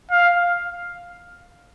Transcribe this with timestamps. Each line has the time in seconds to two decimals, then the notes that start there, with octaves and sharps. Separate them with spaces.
0.11 F5